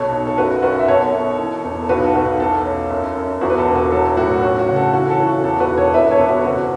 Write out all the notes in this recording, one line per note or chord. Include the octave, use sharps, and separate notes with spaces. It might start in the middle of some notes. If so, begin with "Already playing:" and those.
Already playing: B1 B2 A4 C#5
B1
A4
F#2 F#4 B4
F#2 F#4 B4
E5
B2 A4 C#5
B2
E3
E2
A4
B1 F#4 B4
A4
B1 F#4 B4
E2 A4
C#4
F#2
F#2
E2 F#4
B4
A4
E1
F#4
F#3 A4
A2 F#4
C#4 F#4
F#4
C#3
A4
E3 F#4
A4
E3
F#4
E2 A4
F#4 B4
E1
A4 C#5
E2 B4 E5
A4 C#5
E2
F#4 B4
F#1 F#4